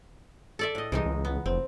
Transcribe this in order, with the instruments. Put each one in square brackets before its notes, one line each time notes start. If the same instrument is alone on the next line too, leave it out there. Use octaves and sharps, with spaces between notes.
[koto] A4 D5 E5
A2 D#5
[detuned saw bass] C2 [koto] E3 G#3 D#4
[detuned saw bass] C#2
[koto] B3
[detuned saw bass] F1 [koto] C4